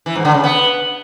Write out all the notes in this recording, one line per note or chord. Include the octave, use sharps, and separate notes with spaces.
E3
G#2
D3
C#3
B3